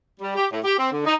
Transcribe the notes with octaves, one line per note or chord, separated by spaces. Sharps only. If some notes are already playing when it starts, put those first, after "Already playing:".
G3
G4
A2
G4
C4
D3
D#4